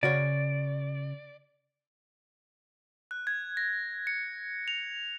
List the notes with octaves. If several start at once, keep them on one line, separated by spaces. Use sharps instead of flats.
C#3 F#4 C#5 D5
F#6
G#6
A#6
C#7
F7